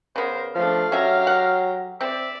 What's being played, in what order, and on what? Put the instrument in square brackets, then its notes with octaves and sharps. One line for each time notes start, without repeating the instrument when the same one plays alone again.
[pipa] C#3 B3 [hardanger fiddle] A#4 [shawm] C5
[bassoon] F3 [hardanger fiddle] A3 D4 [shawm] F5
[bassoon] F#3 [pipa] C#4 E5 [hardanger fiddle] G4 A#5
[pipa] F#5
[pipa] C4 [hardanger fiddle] D5 [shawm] E5